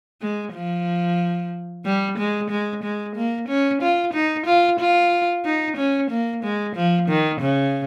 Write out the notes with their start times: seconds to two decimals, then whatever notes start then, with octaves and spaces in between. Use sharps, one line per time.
0.22 G#3
0.54 F3
1.86 G3
2.18 G#3
2.50 G#3
2.83 G#3
3.16 A#3
3.48 C#4
3.82 F4
4.13 D#4
4.46 F4
4.80 F4
5.45 D#4
5.77 C#4
6.11 A#3
6.43 G#3
6.76 F3
7.08 D#3
7.40 C#3